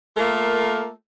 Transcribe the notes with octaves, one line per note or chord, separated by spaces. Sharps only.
A3 A#3 F4 A4 A#4